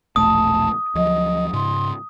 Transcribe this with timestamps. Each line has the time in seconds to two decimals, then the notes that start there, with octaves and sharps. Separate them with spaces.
0.16 E1 A#1 A3 A5 D#6
0.95 D2 F3 F#3 D#5
1.53 G#2 C#3 C6